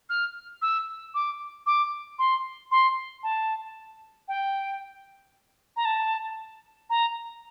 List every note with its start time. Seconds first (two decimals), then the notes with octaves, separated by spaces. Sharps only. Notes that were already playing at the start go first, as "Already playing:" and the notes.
0.09 F6
0.62 E6
1.14 D6
1.66 D6
2.19 C6
2.71 C6
3.23 A5
4.28 G5
5.76 A#5
5.85 A5
6.90 A#5